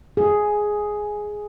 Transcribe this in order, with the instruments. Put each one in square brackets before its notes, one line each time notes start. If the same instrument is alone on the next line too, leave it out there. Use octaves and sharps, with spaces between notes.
[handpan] G#4